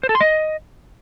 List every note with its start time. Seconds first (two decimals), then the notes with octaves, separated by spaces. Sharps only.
0.03 C5
0.09 A4
0.15 C6
0.21 D#5